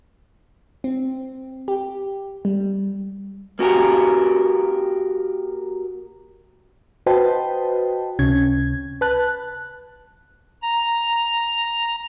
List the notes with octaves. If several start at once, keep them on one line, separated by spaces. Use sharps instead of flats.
C4
G4
G3
A#3 F#4 G4 A#4
F#4 B4 C5 D#5 G5 A5
C#2 C3 C#4 G#6
B4 A5 F#6
A#5